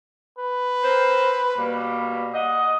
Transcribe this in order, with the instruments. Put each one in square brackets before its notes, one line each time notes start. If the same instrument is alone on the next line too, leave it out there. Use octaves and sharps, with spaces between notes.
[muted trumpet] B4
[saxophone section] C4 A#4 C5
B2 G3 A#3
[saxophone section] D#5 [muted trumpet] F#5